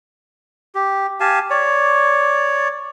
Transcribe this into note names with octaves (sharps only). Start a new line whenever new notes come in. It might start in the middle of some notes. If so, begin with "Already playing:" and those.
G4
G4 F5 G#5 A5
C#5 D5